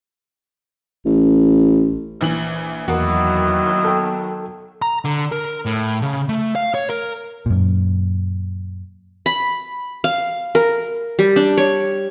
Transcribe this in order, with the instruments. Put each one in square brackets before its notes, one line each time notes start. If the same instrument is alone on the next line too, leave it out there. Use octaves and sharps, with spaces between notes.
[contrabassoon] A1
[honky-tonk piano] A#1 E3 F#7
[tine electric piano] E2 [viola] D#3 F#3 [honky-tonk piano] A#3 B3 F#4 [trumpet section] E4 D#5
[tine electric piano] A4 G5
[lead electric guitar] A#5
D3
A#4
A2
C#3
A3
F5
C#5
A#4
[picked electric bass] F#2 A#2
[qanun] B5
F5
A#4
G3
D4
C#5